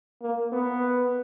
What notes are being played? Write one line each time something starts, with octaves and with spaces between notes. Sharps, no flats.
A#3
B3